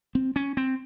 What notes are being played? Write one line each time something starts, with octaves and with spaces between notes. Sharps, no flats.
C4
C#4
C4